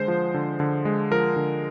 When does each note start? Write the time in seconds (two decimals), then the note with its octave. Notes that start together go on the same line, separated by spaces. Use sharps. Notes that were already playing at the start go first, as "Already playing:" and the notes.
Already playing: D3 G#3 C5
0.08 F3
0.34 D3
0.60 D3
0.85 G#3
1.11 F3 A#4
1.36 D3